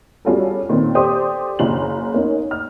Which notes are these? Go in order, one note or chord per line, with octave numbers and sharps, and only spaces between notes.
G3 C#4 F4 F#4 G#4 A4
A#2 D#3 B3 C4
G4 A4 C5 D5 C6 D#6
F#1 C#3 F#7
A#3 C#4 D#4
F6